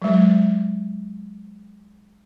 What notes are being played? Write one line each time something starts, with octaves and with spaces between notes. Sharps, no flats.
F#3 G#3